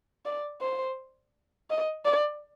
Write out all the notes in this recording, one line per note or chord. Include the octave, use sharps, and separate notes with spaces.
D5
C5
D#5
D5